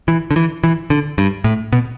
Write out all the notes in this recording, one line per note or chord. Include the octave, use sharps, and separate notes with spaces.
E3
D3
E3
E3
D3
G2
A2
B2